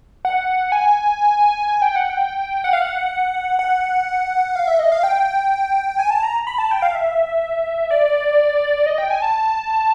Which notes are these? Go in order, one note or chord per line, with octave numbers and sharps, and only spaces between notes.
F#5
G#5
G#5
G5
F#5
G5
F#5
F5
F#5
F#5
F5
E5
D#5
F5
G5
G#5
A5
A#5
B5
A5
G5
F5
E5
D5
D#5
G5
G#5
A5